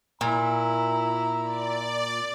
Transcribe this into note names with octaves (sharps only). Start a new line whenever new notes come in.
A#2 E4 A#5
D5